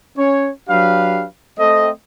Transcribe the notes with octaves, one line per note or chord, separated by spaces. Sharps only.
C#4 C#5
F#3 D4 G4 B4 F5
A3 C4 D#5